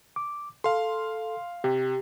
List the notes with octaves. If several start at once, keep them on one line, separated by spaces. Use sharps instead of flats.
D6
A4 F5 C6
C3 G4